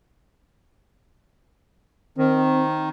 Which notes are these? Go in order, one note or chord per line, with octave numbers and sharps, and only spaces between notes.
D#3 C4